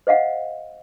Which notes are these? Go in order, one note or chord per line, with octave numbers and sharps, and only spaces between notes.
C5 D#5 F5 F#5